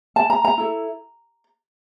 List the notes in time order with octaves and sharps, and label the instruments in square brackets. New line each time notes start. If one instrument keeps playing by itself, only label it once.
[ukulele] A5
A#5
A#5
E4 A4